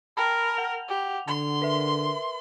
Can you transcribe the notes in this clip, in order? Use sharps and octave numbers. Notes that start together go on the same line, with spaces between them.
A#4 G5 A5 B5
F#5 F7
G4
D3 C6
A#4 B4 E5